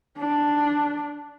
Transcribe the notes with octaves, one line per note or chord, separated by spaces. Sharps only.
D4